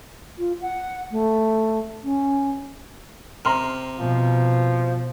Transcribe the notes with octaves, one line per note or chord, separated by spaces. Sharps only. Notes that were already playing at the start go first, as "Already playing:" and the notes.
F4
F#5
A3
C#4
C3 A#5 C6 F6
B2 F3